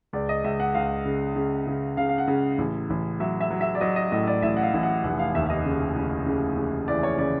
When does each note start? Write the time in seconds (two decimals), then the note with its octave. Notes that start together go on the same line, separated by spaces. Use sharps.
0.13 C#2 D5
0.29 D#5
0.44 C#2 E5
0.60 F#5
0.74 C#2 F5
1.06 C#3
1.36 C#3
1.67 C#3
1.97 C#3 F5
2.09 F5
2.18 F#5
2.28 C#3
2.58 A1
2.90 A1
3.20 F#3 E5
3.40 E5
3.50 F#3
3.61 E5
3.75 D5
3.81 F#3 D#5
3.96 D#5
4.12 A2 D#5
4.27 D5
4.42 A1 E5
4.57 F#5
4.63 F5
4.74 A1
4.83 F#5
5.04 F1 F#5
5.19 F5
5.35 D#2 E5
5.46 E5
5.50 D#5
5.65 C#3
5.96 C#3
6.26 C#3
6.57 C#3
6.88 E3 D5
7.03 C#5
7.18 C#3 D5